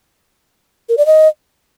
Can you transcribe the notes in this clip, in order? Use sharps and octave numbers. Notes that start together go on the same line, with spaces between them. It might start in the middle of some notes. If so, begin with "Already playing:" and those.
A#4
D5
D#5